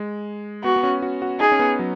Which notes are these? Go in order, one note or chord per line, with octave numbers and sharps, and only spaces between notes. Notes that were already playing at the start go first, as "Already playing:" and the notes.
Already playing: G#3
B3 F#4
B3
C#4
F#4
F#4
D#4 G#4
C#4
B3
F#3